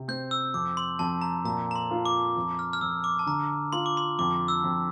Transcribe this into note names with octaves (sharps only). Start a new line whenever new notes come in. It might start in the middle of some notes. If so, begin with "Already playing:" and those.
Already playing: C3
C4 G6
E6
F2 D6
C6
F2 A5
A#5
A#2 A#5
A#5
C6
F4
D6
F2
F6
F6
F2 E6
D6
A5
D3 A#5
F4 C6
D6
C6
F2 D6
E6
F2